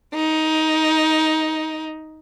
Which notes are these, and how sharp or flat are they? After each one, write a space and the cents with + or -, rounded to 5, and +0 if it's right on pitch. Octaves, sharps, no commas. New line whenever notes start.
D#4 +15